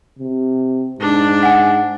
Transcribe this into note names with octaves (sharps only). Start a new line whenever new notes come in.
C3
G#2 D4
F#5 G#5